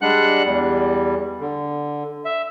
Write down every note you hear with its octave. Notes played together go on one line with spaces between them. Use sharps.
G3 G#3 D4 F#5 F#6
E2 G3
D3
E5